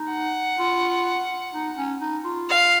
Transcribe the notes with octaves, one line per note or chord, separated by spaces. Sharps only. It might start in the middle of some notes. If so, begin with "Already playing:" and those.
Already playing: D#4
F#5
F4
D#4
C#4
D#4
F4
F5